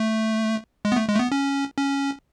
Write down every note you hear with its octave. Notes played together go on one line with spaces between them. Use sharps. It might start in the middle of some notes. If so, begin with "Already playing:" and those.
Already playing: A3
G#3
B3
A3
G#3
A3
B3
C#4
C#4